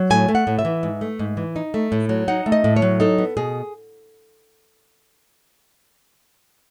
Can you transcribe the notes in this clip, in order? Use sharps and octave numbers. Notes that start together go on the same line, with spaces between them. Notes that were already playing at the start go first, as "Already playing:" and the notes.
Already playing: F#3
A2 G#5
A3
F#5
A2
E5
E3
G#2
A3
G#2
E3
D#4
A3
A2
F#3
D#4 F#5
A3
D#5
A2
C#5
F#3
D#4 A4
B3
B2 G#4